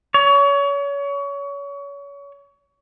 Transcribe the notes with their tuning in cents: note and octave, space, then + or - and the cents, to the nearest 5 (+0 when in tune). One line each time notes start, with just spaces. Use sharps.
C#5 +30